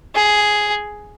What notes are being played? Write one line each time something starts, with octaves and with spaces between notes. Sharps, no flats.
G#4